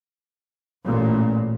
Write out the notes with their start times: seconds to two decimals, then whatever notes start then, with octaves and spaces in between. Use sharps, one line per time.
0.85 A1 A#2